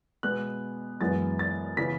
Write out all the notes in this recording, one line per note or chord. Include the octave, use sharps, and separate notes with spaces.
B2 G#3 B3 F#6
F#2 E3 G#3 B3 A6
A6
C#3 E3 B3 B6